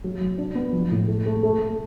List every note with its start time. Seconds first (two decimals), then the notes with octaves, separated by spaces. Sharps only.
0.04 F#3
0.21 F#3
0.38 D4
0.55 B3
0.73 F3
0.91 A2
1.07 A3
1.26 A3
1.43 A3
1.59 A3